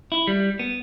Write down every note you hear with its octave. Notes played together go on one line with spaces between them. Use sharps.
E4
G3
B3